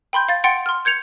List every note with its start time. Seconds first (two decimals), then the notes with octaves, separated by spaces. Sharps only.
0.13 G5 B5 C6 G6
0.29 F5 A6
0.44 F#5 G5 C6 A6 C#7 D7
0.66 C6 F6
0.85 G6 G#6 C#7 F7